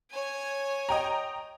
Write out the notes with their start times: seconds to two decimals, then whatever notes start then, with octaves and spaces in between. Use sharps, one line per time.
0.11 C#5 G#5
0.89 D#5 G5 A#5